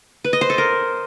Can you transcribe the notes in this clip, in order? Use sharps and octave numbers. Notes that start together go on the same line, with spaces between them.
B4
D#5
C5
A4
A#4